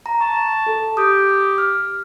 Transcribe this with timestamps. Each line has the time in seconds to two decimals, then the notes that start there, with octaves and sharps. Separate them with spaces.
0.06 A#5
0.20 A5 C#6
0.66 A4
0.97 G4 D#6 G6
1.58 F6